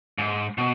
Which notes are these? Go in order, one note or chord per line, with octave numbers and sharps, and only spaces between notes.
G#2
B2